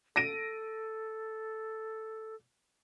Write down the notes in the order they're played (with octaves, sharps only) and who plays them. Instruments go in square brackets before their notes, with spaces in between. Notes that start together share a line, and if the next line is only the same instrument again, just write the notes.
[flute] A4 [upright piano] A#6 D7 D#7